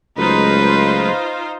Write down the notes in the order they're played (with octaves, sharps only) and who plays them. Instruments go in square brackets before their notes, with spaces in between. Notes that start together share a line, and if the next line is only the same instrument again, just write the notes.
[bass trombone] C#2 [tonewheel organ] F#3 G#3 A3 [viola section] D#4 F4 C5 [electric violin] B4